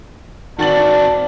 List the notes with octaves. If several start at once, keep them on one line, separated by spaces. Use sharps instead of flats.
D#3 C4 F#4 D5 A5 A6 F#7